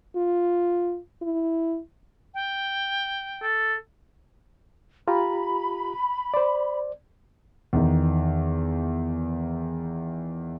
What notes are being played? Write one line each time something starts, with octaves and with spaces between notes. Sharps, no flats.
F4
E4
G5
A4
F4 G4 A#5 B5
C5 D5
E2 D#3